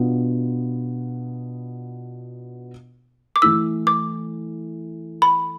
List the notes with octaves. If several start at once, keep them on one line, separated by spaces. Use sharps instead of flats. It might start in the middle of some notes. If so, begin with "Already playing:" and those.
Already playing: B2 B3 D4 F4
D6
E3 A3 E4 E6
D6
B5